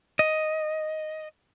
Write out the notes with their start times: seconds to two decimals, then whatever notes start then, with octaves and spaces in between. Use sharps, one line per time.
0.19 D#5